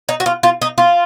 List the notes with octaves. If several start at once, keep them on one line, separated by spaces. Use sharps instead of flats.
D#4
F#4
F4
F4
D#4
F4